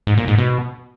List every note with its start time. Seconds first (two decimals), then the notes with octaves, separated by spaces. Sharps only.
0.07 G#2
0.17 A#2
0.28 G#2
0.38 B2